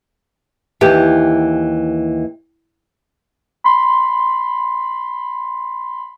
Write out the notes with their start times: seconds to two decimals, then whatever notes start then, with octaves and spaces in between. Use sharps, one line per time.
0.81 D#2 E3 G4
3.64 B5 C6